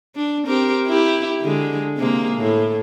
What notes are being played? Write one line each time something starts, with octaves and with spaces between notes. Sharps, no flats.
D4
C4 G4 A#4
E4 G4
D3 G#3
C3 G#3 A#3
A2